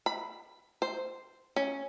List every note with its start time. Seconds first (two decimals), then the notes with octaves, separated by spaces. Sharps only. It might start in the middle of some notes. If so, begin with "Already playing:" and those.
0.06 B5
0.82 C5
1.56 C#4